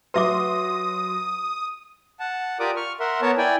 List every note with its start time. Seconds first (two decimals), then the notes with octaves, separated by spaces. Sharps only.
0.14 F#3 B4 E5 C6 D6 D#6
2.20 F#5 A5
2.60 F4 G4 A#4 D5 D6 D#6
2.76 C#6 F6
3.00 A#4 E5 F#5 C6
3.22 B3 A#4 C#5 A5
3.38 E4 D5 G5 G#5